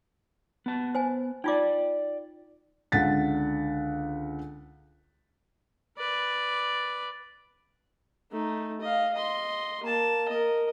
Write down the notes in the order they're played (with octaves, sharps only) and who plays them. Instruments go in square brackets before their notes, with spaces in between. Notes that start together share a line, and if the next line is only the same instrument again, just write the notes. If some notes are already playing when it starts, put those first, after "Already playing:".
[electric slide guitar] B3 A5
[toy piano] C5 G#5
[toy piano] D#4 F4 D6 [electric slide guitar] D5 G5
[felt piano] C#2 D3 F#5 A6 B6
[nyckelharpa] B4 D5
A3 D#4
D#5 F5
D#5 C6
A#3 A5
A#4 D#5